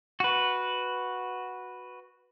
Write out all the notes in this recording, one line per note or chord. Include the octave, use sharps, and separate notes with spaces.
F#4 B4